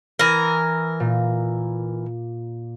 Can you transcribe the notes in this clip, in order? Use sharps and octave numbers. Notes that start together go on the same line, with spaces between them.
E3 A#4
A#2